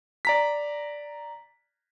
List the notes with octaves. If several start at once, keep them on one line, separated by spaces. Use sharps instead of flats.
D5 A#5 B6